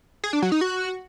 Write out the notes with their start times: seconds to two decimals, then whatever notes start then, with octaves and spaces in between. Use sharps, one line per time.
0.24 G#4
0.33 D4
0.42 F#3
0.52 D#4
0.61 F#4